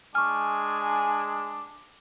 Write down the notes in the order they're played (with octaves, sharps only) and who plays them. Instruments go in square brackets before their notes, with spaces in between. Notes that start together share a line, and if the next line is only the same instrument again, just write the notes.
[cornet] G#3 [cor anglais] D4 [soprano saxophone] G#5 [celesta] C#6 F6